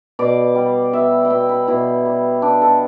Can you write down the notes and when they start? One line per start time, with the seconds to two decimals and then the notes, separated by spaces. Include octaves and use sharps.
0.19 B2 D5
0.55 G3
0.93 B3 E5
1.25 G5
1.30 B2 E5
1.49 B4
1.67 B2 E4
2.06 G3
2.42 B3 D4
2.62 A4